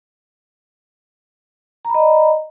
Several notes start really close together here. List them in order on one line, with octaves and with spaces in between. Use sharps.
A#5 B5 D#5 D5